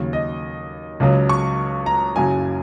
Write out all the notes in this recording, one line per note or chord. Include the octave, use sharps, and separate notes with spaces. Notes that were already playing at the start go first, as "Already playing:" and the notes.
Already playing: D#2 C#3 F#3
D#5
C#2 C#3 F#3
C#6
A#5
F#1 F#2 C#3 F#3 G#5